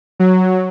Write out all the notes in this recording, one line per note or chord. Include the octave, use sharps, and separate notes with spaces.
F#3